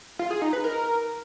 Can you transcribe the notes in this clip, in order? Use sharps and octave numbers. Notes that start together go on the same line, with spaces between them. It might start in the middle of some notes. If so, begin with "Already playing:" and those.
F4
G#4
D#4
B4
A#4